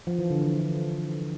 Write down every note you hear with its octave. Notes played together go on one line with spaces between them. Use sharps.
F3
E3
D3
E3